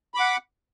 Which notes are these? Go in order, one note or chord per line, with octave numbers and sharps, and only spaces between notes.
F#5 B5 D6